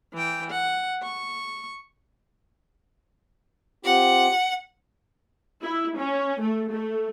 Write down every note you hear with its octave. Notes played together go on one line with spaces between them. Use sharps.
E3 G5
F#5
C#6
C4 F4 G4 F#5
E4
C#4
A3
A3